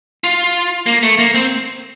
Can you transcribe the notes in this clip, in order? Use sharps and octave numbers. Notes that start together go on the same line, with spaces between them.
F4
A#3
A3
A#3
C4